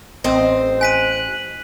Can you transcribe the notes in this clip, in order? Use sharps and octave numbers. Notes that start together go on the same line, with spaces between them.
A1 C4 C5 D#5
G#5 F#6 B6 D#7